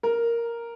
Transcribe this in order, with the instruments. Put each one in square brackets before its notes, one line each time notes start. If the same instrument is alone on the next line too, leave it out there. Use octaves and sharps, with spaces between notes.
[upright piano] A#4